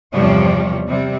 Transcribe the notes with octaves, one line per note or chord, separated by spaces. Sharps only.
E2 G2 C3 F3 G3 C#5
C3 G3